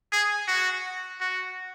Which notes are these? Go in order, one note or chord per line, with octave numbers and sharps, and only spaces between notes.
G#4
F#4
F#4